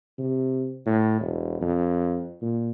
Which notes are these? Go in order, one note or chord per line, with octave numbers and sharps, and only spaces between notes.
C3
A2
E1
F2
A#2